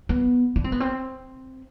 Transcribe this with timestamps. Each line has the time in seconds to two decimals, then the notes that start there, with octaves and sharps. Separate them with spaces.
0.09 B3
0.56 D4
0.64 C4
0.72 B3
0.80 C4